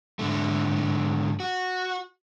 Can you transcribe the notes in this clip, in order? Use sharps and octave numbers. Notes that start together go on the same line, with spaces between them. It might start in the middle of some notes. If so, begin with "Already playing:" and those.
G#2 D3 A3
F#4